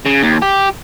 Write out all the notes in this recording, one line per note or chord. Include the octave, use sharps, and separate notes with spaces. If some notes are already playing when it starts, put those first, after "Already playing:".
C#3
D#2
G4